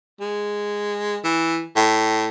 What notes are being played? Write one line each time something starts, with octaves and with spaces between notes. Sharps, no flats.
G#3
E3
A2